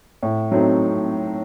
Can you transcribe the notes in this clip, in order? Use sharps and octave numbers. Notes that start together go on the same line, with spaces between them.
A2
F#3 A3 C4 D#4